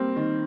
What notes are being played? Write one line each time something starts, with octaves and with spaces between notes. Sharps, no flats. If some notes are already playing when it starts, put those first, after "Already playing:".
Already playing: G3 A#3 C4
D#3